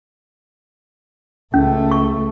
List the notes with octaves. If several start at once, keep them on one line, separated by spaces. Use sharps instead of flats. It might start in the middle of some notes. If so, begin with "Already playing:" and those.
C#2 A3 C#4
C#6